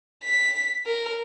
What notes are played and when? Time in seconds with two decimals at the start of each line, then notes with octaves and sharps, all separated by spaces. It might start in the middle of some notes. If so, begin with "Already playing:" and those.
0.24 B6
0.86 A#4